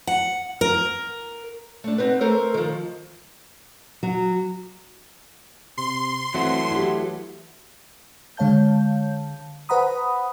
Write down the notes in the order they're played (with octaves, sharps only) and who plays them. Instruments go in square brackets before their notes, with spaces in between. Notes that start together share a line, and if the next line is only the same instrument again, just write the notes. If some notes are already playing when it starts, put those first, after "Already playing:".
[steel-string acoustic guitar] F#5
A#4
A3 D4
B3 C4 D#4 B4
A3 A4 A#4 C5
D#3 F3
[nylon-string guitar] F#3
[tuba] C3 [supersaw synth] C6
[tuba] E3 [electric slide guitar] F#3 A3 F#4 [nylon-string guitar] C4
[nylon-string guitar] E4 G4
[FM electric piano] D3 G#3 C#5 F5 A5 G6
B4 C5 F#5 A#5 B5 D#6